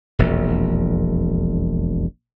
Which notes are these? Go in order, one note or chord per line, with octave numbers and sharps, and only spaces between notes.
E1 A#1 F2